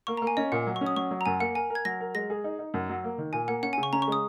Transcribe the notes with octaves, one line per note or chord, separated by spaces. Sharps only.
A#3 C#6
A#3 A#5
G#5
C#4 D#5
A#2 F#5
F#3
C#6
C#4
D#6
F#3 C#6
F#3
A#5
F#2 G#5
A#3 F#5
A#4 G#5
A#4
G#6
F#3 A#6
A#4
G#3 A#6
G#4
D#4
D#4
F#2
F#3
A#3
D#3
A#2 G#5
A#3 F#5
C#4 F#5
C#3 G#5
C#6
C#4 A#5
C#6
G#3 D#6